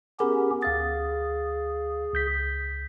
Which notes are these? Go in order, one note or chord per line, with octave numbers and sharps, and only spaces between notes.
B3 C#4 G4 G#4 A#4 B5
D2 G#4 F5 A6
C#2 G6 B6